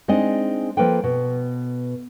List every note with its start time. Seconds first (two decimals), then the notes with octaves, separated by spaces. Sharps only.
0.08 G#3 C4 D4 D#4 D#5
0.77 F3 A#3 A4 B4 G5
1.04 B2